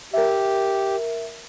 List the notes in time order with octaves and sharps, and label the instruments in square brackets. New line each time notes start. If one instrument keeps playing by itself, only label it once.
[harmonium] G4 [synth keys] A#4 E5